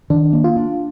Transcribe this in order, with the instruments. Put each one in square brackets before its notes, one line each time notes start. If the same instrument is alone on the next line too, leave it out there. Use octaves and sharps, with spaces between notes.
[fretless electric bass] D#3 [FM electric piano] D4
[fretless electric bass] A#3
[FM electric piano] F4
[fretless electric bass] D4